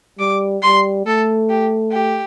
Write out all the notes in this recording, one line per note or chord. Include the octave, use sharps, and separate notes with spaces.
G3 D6
G3 C6
A3 A4
G4
G4